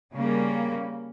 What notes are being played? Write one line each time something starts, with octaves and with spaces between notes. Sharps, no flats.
C#3 G3 A#3